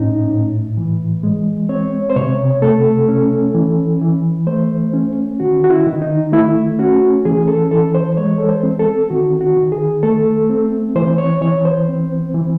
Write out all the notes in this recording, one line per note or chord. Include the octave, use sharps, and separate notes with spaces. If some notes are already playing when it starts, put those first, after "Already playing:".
Already playing: A2 C#4 D#4
A2
E3
G#3
C4 C#5
C5
C3 C#5
A3 A4
C#4
E3
E3
A3 C5
C#4
D#3 F#4
F#4
E4
D#3
D#4
A3 E4
C#4 F#4
E3 G#4
A4
E3 A4
C5
G#3 C#5
A4
C5
C4
A4
D#3 F#4
F#4
D#3
G#4
A3 A4
C4
E3 C5
C#5
E3 C#5
C5
C4
E3